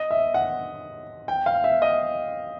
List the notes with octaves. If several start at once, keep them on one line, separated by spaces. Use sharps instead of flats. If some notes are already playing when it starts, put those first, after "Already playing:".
Already playing: D#5
E5
F#5
G5
F5
E5
D#5